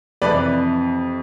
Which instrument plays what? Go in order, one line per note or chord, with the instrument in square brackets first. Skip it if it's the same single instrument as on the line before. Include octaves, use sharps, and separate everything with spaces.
[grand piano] F2 C3 E3 B4 D5